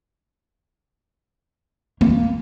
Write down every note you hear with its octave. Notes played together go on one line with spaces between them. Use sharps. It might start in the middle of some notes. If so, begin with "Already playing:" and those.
A#3